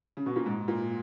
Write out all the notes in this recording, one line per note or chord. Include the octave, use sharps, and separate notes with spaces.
C#3
B2
A#2
G#2
A#2